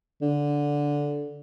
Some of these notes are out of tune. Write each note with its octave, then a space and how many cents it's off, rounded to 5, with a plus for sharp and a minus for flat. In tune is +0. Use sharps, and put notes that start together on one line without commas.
D3 -10